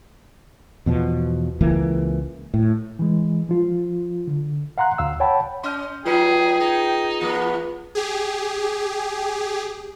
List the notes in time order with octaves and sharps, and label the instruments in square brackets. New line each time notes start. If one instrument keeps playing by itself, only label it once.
[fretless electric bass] E2 B2 F3
C#2 E3 A#3
A2
[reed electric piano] E3 G#3
F3 F4
D3
F5 F#5 A#5 C6 F#6
D2 F5 E6
C#5 F#5 G5 A5 B5
[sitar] C#4 D#5 [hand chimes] C6 F6 G6
[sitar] F3 F#3 D#4 [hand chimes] F4 B4 [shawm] G#4 [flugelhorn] G5
[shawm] D#4 [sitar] G#4
[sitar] E3 A3 [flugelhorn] B3
[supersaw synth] G4 G#4